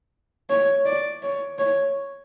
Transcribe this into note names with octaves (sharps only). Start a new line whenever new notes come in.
C#5
D5
C#5
C#5